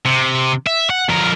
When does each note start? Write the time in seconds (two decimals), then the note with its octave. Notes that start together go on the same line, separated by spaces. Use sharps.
0.06 C3
0.67 E5
0.90 F#5
1.09 F2 A#4